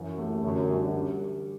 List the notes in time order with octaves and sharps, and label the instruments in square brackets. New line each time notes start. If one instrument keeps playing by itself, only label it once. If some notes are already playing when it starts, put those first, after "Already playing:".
Already playing: [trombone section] F#2 [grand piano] E3
[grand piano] A3 E4 G4
[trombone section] F#2 [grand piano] D3
[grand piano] G3 D4 F#4
G3